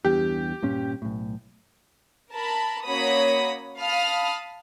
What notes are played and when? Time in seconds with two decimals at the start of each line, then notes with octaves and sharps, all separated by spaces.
0.05 E2 G2 G4
0.62 G2 A#2 C#4
1.02 B1 A2
2.32 A#4 A5 B5
2.85 A#3 C#4 F#4 C#5 B5 D#6
3.78 F5 A5 B5 D#6 F6